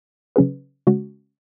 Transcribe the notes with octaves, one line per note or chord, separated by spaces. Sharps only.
C#3 F#3 C#4 G#4 B4
C#3 G#3 C#4 F#4